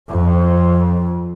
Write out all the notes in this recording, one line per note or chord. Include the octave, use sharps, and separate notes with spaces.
F2